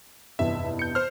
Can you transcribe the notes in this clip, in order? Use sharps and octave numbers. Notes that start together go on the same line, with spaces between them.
F1 E2 G2 E5
G6 C#7
C5 F6